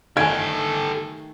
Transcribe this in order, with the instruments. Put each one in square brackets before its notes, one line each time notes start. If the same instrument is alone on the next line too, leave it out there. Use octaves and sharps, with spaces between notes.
[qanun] D#3 A3 [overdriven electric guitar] G4 A4 [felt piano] G#5 G#6